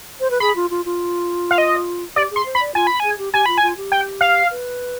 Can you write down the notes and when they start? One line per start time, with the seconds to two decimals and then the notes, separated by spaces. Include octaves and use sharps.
0.20 C5
0.31 B4
0.40 G#4 B5
0.56 F4
0.70 F4
0.85 F4
1.51 F5
1.58 D#5
2.16 G4 D5
2.30 G#4
2.36 C6
2.46 C5
2.55 B5
2.60 D5
2.75 F4 G#5
2.87 B5
3.00 G#4 G#5
3.18 G4
3.33 G4 G#5
3.46 F4 B5
3.58 F4 G#5
3.77 G4
3.92 G5
4.21 F5
4.50 B4